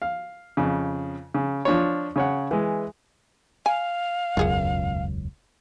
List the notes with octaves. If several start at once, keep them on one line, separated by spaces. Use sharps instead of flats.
F5
F2 C#3
C#3
F3 D4 F4 C#5
C#3 C#5 F#5
E3 G#3
F5 G#5
E1 C#2 F#2 F4 G#4 F#5